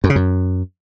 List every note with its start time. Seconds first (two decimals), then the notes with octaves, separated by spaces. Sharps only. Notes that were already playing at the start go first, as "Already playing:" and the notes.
0.04 F#2
0.10 C#3
0.16 F#2